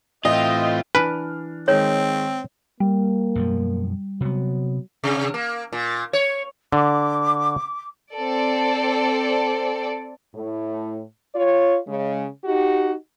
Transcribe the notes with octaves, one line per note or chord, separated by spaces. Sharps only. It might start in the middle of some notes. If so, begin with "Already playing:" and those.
A2 E3 C4 F4 D#5 E5 G5
E3 D4 B4 G#5 F6
D#3 G#3 C4 C#5
G3 A#3
F#2 B2 F3
C3 F#3 B3
C3
A#3
A#2
C#5
D3 D6
C4 A4 D5
A2
F4 C#5
C#3 G#3
D#4 F#4 G4